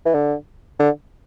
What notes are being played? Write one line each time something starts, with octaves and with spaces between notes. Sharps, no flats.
E3
D3
D3